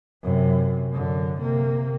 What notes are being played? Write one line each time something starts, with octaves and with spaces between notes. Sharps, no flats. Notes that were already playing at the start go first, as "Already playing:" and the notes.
F#2 C3
F#2 D3
C3 A#3